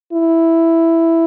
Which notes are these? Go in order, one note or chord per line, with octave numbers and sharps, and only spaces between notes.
E4